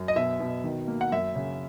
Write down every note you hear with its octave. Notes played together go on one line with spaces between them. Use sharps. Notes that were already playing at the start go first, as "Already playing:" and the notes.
Already playing: F#2
D#5
B2 E5
B2
D#3
A#3
F#5
F#2 E5
C#3